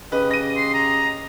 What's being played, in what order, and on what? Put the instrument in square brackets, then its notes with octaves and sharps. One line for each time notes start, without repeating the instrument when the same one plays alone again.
[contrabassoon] C#3 [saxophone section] G4 D#5 [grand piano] B4
[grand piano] A#6 D#7
[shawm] C6
A#5